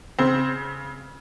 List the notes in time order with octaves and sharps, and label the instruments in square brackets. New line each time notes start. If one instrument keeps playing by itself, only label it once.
[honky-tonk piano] C#3 C4